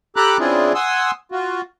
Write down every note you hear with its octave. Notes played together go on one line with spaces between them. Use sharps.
G4 A4 A#5 B5 D6 F#6
C#3 C4 D4 E4 F4 G#4
F#5 G#5 C6 D#6 E6
F4 F#4